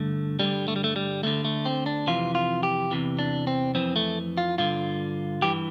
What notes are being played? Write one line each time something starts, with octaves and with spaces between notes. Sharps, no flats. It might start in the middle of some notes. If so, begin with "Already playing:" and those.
Already playing: G2 D3 A3
G2 D3 G3
A3
G3
A3
G3
D2 D3 A3
A3
C4
D4
F2 C3 E3 F4
F4
G4
E2 C3 E3
D4
C4
F2 E3 C4
A3
F4
G2 D3 F4
G2 E3 G4